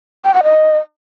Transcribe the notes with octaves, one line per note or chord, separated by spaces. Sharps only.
G5
F#5
D#5